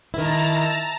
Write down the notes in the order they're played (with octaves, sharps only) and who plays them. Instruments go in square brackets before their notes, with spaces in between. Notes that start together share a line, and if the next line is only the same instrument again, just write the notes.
[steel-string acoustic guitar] D#3 E4 [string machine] A5 A#5